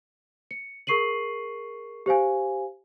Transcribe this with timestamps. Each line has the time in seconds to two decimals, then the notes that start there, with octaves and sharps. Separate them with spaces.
0.51 C#7
0.87 G#4 A#4 C#6 C7 D#7 F#7
2.06 G4 C5 F5 G#5